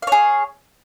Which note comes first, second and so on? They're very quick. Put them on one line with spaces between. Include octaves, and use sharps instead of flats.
F5 C#5 G#4